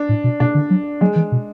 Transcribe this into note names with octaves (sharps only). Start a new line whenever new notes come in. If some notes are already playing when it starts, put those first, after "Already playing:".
Already playing: D4
A2
B2
B2 D4
D3
F#3
F#3 G#3
E3
B2